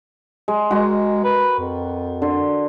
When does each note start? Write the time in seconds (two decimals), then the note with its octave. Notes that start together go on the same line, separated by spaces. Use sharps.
0.48 G#3
0.71 G#3 F#4 A#4
1.24 B4
1.59 F2
2.22 D3 C6